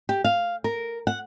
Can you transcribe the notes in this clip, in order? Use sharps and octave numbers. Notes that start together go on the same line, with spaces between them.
G4
F5
A#4
F#5